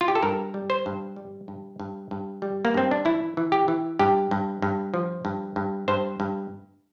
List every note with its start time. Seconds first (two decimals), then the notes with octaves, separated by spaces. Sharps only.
0.01 F4
0.08 G4
0.15 A4
0.23 G2 A#4
0.54 G3
0.70 C5
0.86 G2
1.16 G3
1.48 G2
1.80 G2
2.11 G2
2.42 G3
2.65 A#3
2.74 G2 C4
2.91 D4
3.05 E3 E4
3.37 E3
3.52 G4
3.68 E3
3.99 G2 G4
4.31 G2
4.62 G2
4.94 F3
5.25 G2
5.56 G2
5.88 G2 C5
6.20 G2